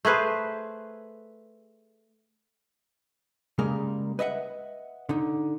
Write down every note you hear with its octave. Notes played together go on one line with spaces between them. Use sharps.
A3 G#4 B4 C5
C#3 G3 G#3 A#3 A#4
B4 D#5 E5 F#5
D3 D#4